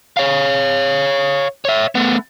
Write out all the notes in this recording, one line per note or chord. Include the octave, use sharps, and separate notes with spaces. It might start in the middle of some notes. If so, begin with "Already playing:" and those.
C#5 F5
C#5 E5
A3 B3